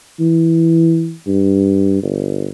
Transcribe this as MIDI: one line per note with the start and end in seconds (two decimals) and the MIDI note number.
0.20 1.14 52
1.27 2.00 43
2.03 2.51 31